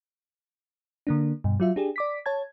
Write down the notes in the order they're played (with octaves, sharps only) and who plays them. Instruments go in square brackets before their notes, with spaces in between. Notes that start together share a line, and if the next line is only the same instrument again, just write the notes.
[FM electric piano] D3 A#3 D4
G2 B2
F#3 F4 E5
D4 G4 G#4
D5 D6 B6
C#5 A5 G#6